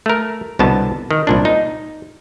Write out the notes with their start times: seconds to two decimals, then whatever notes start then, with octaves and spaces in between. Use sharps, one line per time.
0.06 A3 A#4
0.59 C2 B2 D3 B3 A5
1.11 D#3
1.27 C2 A#2 D4
1.45 D#4